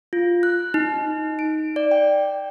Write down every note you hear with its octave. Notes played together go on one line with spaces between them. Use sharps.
F4
F#6
D#4
D7
D5
G5